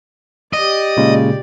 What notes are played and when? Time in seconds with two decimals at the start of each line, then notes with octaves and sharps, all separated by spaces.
0.53 G4 D5 D#5
0.97 A#2 C#3 G#3